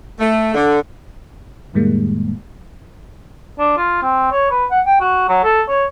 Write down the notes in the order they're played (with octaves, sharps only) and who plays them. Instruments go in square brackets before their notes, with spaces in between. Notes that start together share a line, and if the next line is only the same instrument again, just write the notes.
[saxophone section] A3
D3
[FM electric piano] F2 A2 D#3 G3 G#3 A#3
[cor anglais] D4
F4
C4
C#5
B4
F#5
G5
F#4
F#3
A4
C#5